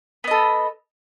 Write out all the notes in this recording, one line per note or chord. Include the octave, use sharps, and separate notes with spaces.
B3 A4 D#5